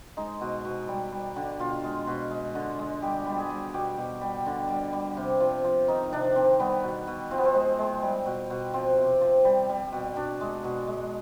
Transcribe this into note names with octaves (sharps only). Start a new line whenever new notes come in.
G#3 D#4
B2
B2
G3
G3
D3
B2 F4
G#3
B2
G#3
D3
G#3
G3 G4
G3
G#4
G3
B2 G4
B2
G3
D3
G3
G3
C3
F3
F3
D#3 D#4
C3 D4
D#3 C4
G3 B3
B2
B2
F3 C4
B3
C4
G#3
G#3
G3
B2
B2
F3 C4
C3
F3
G3
G3
B2
B2 D4
G#3
B2
G#3